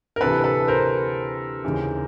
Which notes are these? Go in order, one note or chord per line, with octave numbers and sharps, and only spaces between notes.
A#4
D2 C3 E3 A4 B4
A4 B4
A#4 C5
D#2 C#3 E3